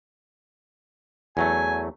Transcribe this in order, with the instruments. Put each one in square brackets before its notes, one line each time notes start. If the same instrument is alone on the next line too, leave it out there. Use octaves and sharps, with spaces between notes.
[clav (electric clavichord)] E2 F#3 A3 [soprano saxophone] G#5